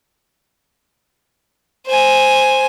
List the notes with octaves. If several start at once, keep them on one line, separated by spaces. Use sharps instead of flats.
C5 G#5